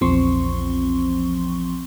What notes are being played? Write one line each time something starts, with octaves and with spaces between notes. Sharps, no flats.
A#1 E2 F3 C4 C6 C#6